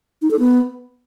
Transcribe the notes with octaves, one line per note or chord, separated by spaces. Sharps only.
D#4
A4
B3